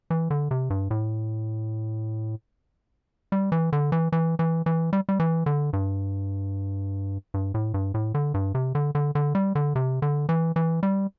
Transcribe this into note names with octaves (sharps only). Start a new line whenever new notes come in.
E3
D3
C3
G2
A2
G3
E3
D3
E3
E3
E3
E3
G3
G3
E3
D3
G2
G2
A2
G2
A2
D3
G2
C3
D3
D3
D3
G3
D3
C3
D3
E3
E3
G3